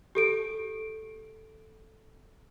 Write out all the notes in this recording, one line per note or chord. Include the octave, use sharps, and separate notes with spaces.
G4 A4 D7